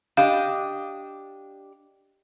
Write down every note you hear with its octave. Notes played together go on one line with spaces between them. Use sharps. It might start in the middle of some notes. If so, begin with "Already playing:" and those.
D4 G4 D#5 F5